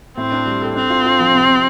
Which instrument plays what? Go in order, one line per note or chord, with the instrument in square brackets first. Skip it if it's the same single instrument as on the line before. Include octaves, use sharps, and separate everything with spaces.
[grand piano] A2 [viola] C4
[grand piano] D4
G3
A4
[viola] C4 [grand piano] D4
[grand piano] F4
F4
F3
C3
C3